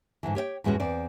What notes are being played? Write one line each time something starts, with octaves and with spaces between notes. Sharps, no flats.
G#2 B2 D3 E3
G4 C#5 D5 G5
E2 A2 G#3 C#4 F#4
E2 C4 D5